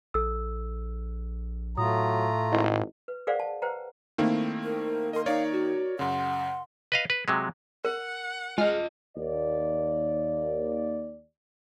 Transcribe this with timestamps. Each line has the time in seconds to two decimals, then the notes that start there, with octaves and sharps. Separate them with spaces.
0.14 A#1 A4 E6
1.77 A2 F#3 A3 F4 A#5 D#6
2.52 G#1 E4 D#5
3.08 B4
3.27 G#4 A#4 C5 D5 F5 F#5
3.40 A5
3.62 B4 C5 F#5 G5 A#5
4.18 D#3 A3 A#3 C4 E4
4.63 A#4
5.13 A#4 D#5 C6
5.26 D#4 A#4 C#5 D5 F5
5.52 F#4
5.99 F#2 C#3 F#5 C6
6.92 B4 D#5 F5
7.10 B4
7.28 C3 F#3 G#3
7.85 A#4 F#5
8.58 G#3 F4 D#5 F6
9.17 D#2 D5